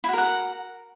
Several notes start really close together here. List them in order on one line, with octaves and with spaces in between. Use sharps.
E4 F#4 A#4 F#5